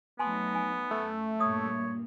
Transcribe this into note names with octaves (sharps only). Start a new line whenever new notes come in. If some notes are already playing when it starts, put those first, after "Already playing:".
F#3 A3 B3 D#4 G#5 A5 C6
G#5
F#2 A3
G2 A#2 A#3 C#5 D#6